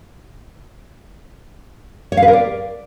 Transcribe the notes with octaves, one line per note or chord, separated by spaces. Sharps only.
C#5
F5
B4
A#4
D5